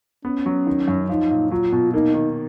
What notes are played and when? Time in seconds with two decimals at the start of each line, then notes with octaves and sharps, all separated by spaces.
0.25 B3 C#4
0.46 F#3
0.67 D#3
0.88 F#2
1.09 F3 D#4
1.31 A#2
1.51 F#3 F4
1.72 B2
1.94 A#3 D#4
2.14 D#3